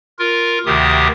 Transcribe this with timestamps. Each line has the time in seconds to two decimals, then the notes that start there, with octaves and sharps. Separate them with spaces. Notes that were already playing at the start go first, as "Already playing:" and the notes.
0.19 F4 A#4
0.66 D2 C3 D#3 G4 D#6